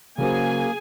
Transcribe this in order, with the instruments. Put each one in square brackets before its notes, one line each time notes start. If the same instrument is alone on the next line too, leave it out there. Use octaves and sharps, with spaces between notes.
[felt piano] C#3 F#3 C5 [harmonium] A#3 [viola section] G#4 G#5